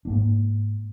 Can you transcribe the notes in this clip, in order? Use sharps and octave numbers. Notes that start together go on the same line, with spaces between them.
G#2 A#3 D4